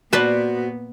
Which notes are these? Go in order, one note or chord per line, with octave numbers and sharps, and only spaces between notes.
A#2 B3 F#4 B4 C5 D5 A5